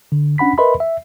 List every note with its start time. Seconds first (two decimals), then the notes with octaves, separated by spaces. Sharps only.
0.12 D3
0.38 C#4 D4 F#5 B5 B6
0.58 A#4 B4 D#5 E5 B5 C6
0.80 E5